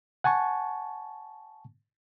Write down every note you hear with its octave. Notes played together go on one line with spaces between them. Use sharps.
F#5 G#5 A5 C#6